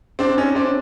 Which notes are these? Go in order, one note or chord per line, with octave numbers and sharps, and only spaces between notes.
C4 D4
C#4 D#4
C4 D4